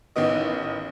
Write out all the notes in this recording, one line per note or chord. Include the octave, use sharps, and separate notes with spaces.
A1 D#3 B3 D#5